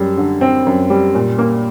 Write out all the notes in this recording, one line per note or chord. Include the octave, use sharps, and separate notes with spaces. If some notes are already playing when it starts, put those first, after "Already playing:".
Already playing: F#2 G3
D3
C4
F#2
G3
A#2
A#3